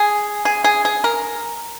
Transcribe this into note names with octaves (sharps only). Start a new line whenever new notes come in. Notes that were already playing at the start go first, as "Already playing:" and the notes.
Already playing: G#4
G#4
G#4
G#4
A#4